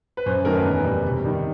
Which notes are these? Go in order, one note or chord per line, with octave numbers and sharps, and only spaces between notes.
B4
F#2 C5
D#3 F#3 A3 A#4
B4
E2
B2 G3
C3
D#3 G3